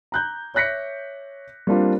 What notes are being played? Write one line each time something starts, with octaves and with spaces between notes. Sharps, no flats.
A#5 F#6 G6
C#5 E5 F#6 A#6 B6 C#7
G3 A#3 C4 D4 F4